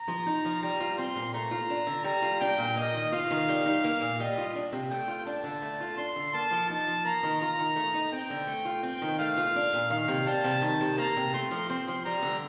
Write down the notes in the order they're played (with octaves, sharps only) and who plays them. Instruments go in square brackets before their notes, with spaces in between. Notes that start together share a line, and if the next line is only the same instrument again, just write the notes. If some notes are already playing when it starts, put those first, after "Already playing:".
Already playing: [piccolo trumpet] A#5
[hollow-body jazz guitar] F3
D#4
F3
[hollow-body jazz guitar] G3 [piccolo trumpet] A#5
[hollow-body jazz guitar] F4
[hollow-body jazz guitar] C4 [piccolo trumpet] C6
[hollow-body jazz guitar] A#2
[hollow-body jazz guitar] A3 [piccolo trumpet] A#5
[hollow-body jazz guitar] F4
D4
D3
[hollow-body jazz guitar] G3 [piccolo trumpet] A#5
[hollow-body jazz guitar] F4
[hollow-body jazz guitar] D4 [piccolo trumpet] G5
[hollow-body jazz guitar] A#2
[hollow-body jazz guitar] A#3 [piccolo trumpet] D#5
[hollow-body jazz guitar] D#3
[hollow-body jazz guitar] F4 [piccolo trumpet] F5
[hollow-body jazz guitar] D#3
G3
D#4
A#3
A#2
[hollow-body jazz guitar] G3 [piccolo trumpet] D#5
[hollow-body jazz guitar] F4
D4
C3
[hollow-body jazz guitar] A3 [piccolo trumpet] G5
[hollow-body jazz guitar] F4
[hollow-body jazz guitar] D4 [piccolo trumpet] A5
[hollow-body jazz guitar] D3
A3
F4
[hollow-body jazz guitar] D4 [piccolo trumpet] C6
[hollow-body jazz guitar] D3
[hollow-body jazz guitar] A#3 [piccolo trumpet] A5
[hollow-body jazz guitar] F3
[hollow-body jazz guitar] D#4 [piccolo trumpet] A5
[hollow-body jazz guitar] F3
[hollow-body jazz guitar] A#3 [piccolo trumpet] A#5
[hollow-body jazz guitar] D#3
[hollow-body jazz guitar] F4 [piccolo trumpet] A#5
[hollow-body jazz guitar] D#3
A3
D#4
[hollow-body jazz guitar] C4 [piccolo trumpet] G5
[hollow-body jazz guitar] D3
A3
F4
[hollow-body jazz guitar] C4 [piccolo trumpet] G5
[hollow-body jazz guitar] D#3
[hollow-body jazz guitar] A3 [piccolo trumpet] F5
[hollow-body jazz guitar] F4
D4
A#2
[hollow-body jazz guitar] D#3 [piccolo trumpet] F5
[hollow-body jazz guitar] C3
[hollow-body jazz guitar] G3 [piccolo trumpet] A5
[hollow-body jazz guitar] C3
D#3
C3
[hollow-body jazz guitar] A#3 [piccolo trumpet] A#5
[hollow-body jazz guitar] C3
[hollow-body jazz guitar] A3 [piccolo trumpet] C6
[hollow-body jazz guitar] F3
[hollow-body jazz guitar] C4 [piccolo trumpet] C6
[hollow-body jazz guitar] F3
[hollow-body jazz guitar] G3 [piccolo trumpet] A#5
[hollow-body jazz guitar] D3